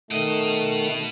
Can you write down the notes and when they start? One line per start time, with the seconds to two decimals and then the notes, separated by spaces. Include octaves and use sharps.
0.11 B2 D#3 A3 D#5